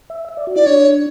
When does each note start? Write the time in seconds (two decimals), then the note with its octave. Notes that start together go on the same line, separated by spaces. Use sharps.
0.10 E5
0.29 E5
0.37 D5
0.47 F#4
0.56 E4 D5
0.66 D4 C#5